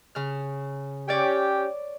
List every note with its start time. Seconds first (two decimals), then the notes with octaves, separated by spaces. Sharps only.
0.15 C#3 F6
1.09 C#4 G4 C#5 D5